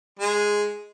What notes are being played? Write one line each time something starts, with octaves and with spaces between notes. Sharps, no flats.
G#3